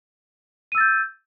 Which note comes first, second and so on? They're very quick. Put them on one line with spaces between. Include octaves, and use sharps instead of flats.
D#7 E6 A6 G6